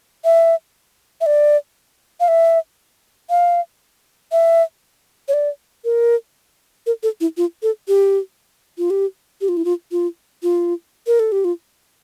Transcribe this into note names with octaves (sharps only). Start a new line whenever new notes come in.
E5
E5
D5
F5
E5
F5
E5
C#5
D5
A#4
A#4
A4
E4
F4
A4
G4
F4
G4
G4
F4
E4
F4
F4
F4
A#4
A4
G4
F4